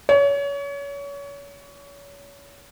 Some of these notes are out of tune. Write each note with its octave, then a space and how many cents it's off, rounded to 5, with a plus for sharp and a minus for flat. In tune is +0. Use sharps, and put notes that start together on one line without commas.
C#5 +30